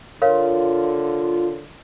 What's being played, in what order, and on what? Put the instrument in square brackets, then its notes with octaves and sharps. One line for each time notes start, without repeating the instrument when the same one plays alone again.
[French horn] D3 [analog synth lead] F4 [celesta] A#4 C#5 F5